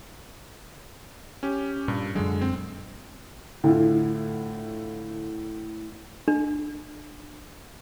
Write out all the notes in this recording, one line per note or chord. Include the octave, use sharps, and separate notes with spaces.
C#4 G4
G2 A#2
F#2 A#2 D3 F#3 G#3
C4
A2 D3 E4 F4
D4